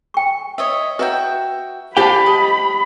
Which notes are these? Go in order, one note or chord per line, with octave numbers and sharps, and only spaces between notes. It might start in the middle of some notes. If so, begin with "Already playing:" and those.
G5 C#6
C#5 D#5 E5
F#4 B4 E5 G5 A#5
G4 C5 D5 F5 G5 A5 B5 D6
D#5